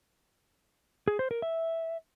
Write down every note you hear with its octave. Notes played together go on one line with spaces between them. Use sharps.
G#4
C5
A#4
E5